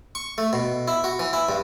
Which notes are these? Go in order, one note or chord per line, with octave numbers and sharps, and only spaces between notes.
C#6
A3
B2
E4
F#4
E3
E4
G2